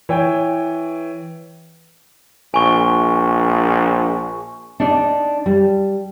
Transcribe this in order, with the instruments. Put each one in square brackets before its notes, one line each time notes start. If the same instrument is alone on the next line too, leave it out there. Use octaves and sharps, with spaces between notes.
[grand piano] E3 C#5 G5
[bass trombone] A#1 [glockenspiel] G#5 C#6
[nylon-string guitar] D4 D#4 D5
G3